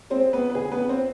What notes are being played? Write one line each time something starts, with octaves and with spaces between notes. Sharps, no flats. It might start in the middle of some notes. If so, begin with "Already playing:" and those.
G#3 C4 C5
F2 B3 B4
B4
D3 G#4
B3 B4
F2
C4 C5